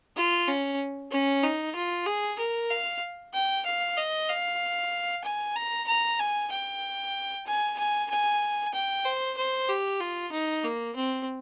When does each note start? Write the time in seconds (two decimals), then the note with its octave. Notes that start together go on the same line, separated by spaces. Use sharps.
0.16 F4
0.48 C#4
1.12 C#4
1.43 D#4
1.75 F4
2.06 G#4
2.39 A#4
2.71 F5
3.34 G5
3.66 F5
3.97 D#5
4.29 F5
5.24 G#5
5.56 A#5
5.88 A#5
6.19 G#5
6.51 G5
7.46 G#5
7.78 G#5
8.10 G#5
8.74 G5
9.05 C5
9.37 C5
9.69 G4
10.00 F4
10.32 D#4
10.63 A#3
10.96 C4